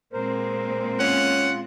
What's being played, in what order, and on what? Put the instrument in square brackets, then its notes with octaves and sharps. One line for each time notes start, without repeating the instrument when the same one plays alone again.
[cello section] A#2 G#3 C4 [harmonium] A#4 C5
[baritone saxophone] C#4 [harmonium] F4 [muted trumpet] F#5